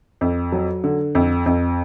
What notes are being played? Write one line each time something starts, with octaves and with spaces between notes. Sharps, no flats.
F2
F#3
D3
F2
F2